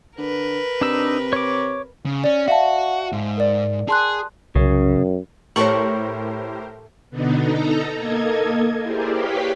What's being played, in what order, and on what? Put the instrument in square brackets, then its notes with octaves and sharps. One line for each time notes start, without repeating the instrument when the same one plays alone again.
[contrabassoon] D3 [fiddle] A#4 B4
[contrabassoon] C3 [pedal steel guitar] D4 D#4 E6
[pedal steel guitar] C#5 D6
[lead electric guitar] C#3
[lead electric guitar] C#4 [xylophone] D5
[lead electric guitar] F#4 [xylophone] E5 F5 A5
[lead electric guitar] G#2
[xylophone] A#4 D5
[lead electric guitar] G#4 [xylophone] A5 C6 F#6
[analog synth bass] C2 [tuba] F#2 [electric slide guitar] C#3
[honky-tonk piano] A2 [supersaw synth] G4 A#4 C5 [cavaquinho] A4 C#6 [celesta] C#5 F#7
[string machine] B2 D3 B3 D4 D#4
D#4 A4 A#5
A#3 A4 D#5 G#6
E4 G4 G#4 A#4 C5 D5
G4 B4 C#5 F5 G5 B5